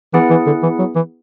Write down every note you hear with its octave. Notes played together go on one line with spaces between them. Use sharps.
E3 B3 E4 G#4 B4 F#5
E3
D3
E3
F#3
E3